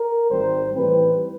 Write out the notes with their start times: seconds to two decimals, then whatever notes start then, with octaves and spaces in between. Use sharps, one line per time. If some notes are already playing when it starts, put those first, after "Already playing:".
Already playing: A#4
0.30 G#1 G#2 D#3 G3 C4 C5
0.75 A2 E3 G3 C4 B4